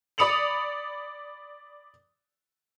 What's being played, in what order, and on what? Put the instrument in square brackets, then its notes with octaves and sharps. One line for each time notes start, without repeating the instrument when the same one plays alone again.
[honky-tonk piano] D5 B5 D#6 C#7 F7 F#7